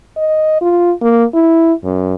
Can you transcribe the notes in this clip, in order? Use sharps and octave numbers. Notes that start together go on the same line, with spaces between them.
D#5
F4
A#3
E4
F#2